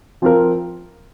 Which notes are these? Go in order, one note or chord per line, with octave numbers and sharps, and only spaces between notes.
F3 C4 F4 A#4